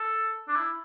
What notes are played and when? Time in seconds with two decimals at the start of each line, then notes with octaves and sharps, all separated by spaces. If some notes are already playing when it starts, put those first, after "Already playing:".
Already playing: A4
0.48 D4
0.56 E4